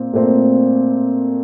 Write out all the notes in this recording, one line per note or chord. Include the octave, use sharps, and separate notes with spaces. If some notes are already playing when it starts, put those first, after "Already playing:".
Already playing: A#2 C4
A#2 A3 C4